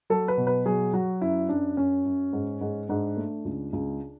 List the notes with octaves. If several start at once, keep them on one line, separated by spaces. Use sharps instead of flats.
F#3 A4
B4
B2
B4
F#3 G#4
F#3 F#4
F#2 E4
F#2 D4
F#2 C#4
F#2
G#2
G#2
G#2 D4
A3
C#2
C#2